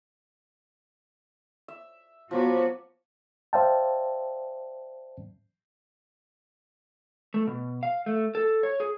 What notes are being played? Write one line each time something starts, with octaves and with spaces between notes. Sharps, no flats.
E5
F3 F#3 B3 F#4 D6
C5 D5 E5 F5 G5 A5
A3
B2
F5
A3
A4
C#5
G#4